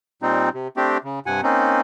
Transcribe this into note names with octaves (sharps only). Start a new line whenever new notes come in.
A#2 G3 C4 D#4
C3
A3 C4 D4 G4
C#3
G2 C3 F#5 G#5
A#3 C4 C#4 D#4